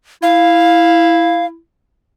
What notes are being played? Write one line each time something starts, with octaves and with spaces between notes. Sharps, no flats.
E4 F5